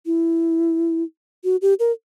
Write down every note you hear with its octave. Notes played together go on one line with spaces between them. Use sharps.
E4
F#4
G4
A#4